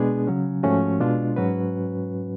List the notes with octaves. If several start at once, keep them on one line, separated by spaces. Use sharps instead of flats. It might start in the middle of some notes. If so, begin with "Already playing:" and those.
Already playing: B2 G#3 B3 D4 G#4
C#3 F#3 C#4
G#2 F3 A3 C#4 F#4
B2 G#3 D4 F4
G#2 F#3 C#4 F#4 B4